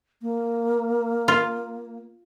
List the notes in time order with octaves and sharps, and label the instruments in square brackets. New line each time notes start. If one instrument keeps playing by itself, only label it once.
[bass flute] A#3
[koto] F4